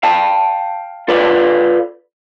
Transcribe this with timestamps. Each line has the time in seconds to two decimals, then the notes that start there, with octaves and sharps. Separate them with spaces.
0.03 F5 G5 A5
1.08 F4 A4 B4 D5 F5